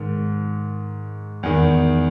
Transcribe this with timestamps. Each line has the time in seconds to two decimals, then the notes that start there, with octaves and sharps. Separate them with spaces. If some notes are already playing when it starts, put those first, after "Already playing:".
Already playing: G#2 D#3
1.43 E2 D#3